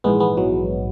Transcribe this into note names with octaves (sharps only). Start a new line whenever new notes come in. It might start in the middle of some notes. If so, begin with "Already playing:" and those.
A#1 G#2 E3 G#3 B3
G#3 B3
E3 F#3